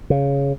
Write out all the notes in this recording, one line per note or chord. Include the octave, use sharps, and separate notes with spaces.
C#3